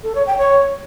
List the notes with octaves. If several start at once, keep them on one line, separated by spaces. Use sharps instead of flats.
A4
C#5
G5
C#5